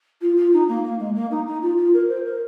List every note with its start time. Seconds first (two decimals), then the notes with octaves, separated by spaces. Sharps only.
0.21 F4
0.37 F4
0.53 D#4
0.68 A#3
0.84 A#3
0.99 G#3
1.15 A#3
1.31 D#4
1.47 D#4
1.62 F4
1.77 F4
1.94 A#4
2.09 C5
2.25 A#4